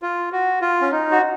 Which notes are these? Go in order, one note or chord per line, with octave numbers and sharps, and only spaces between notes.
F4
F#4
F4
C#4
D#4
F#4